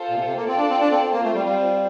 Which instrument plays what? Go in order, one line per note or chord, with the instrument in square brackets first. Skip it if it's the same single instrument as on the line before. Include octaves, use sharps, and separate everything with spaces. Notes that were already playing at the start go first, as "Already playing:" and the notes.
Already playing: [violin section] F4 A4 C5
[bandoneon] A#2
C3
C3
A#3
[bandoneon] C4 [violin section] F4 A4 D5 A5
[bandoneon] D4
C4
D4
C4
C4
[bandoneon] A#3 [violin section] C4 F4 C5
[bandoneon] A3
G3
G3